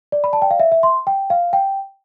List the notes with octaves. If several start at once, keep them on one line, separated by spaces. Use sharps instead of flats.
D5
B5
A5
G5
F5
E5
E5
C6
G5
F5
G5